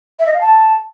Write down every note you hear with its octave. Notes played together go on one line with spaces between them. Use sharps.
E5
D#5
F5
A5